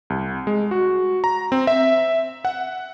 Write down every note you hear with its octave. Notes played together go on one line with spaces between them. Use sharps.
C2
G#3
F#4
A#5
C4
E5
F#5